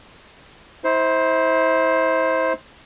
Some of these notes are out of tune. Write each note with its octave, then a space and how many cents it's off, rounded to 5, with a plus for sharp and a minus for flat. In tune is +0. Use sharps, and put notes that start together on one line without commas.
E4 -35 C5 +5